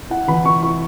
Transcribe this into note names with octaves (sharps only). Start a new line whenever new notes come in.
E4 F#5
E3 B5
E3 C#6
E4 C#6